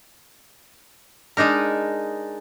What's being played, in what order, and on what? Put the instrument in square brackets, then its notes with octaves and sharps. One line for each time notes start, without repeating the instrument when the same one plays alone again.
[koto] G#3 D4 D#4 A#4